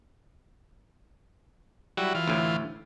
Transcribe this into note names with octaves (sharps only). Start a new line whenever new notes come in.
F#3 G3 E4 F#4
E3 F4
D2 A2